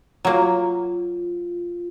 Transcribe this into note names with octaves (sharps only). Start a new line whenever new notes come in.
F#3 A#3 F4